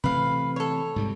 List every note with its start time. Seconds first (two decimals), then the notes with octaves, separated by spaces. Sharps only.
0.04 C3 E3 A3 B4 F5
0.56 A4 C#5
0.96 G#2 C3 G3